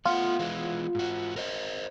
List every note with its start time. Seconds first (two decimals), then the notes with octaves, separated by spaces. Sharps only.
0.05 A3 B3 F4 F#5
0.39 E3 G#3 B3
0.95 G#2 F#4
1.36 A#4 C5 D#5